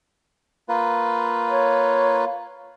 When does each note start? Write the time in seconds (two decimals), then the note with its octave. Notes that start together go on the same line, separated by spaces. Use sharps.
0.69 A#3 F4 B4
1.50 C#5